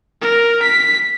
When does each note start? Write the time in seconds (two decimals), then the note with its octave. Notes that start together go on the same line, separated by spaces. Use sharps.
0.22 A#4
0.62 B6